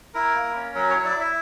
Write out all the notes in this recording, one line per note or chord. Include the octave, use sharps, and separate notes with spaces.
E4 A#4
A#3
C#4
F#3 A#4
C#5
E4
D5
E4
E5